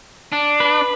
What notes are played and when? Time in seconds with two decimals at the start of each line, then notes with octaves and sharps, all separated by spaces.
0.32 D4
0.60 B4